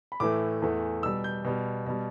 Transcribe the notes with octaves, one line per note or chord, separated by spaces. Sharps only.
B5
A2 E3 A3 D6
E2 E3 A3
B2 G3 E6
G6
B2 G3
B2 G3